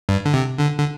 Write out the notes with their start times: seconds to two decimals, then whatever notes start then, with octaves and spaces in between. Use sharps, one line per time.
0.09 G2
0.25 D3
0.34 C3
0.59 D3
0.79 D3